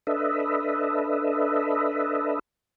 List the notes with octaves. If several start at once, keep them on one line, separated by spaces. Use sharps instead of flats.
D4 A4 B4 D#5 E5